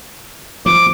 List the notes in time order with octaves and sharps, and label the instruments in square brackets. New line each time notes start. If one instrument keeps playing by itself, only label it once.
[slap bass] F3 [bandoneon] D6